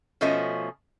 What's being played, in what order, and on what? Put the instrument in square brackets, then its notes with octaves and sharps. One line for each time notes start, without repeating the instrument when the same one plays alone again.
[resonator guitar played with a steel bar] B2 F3 A3 C#4 D#5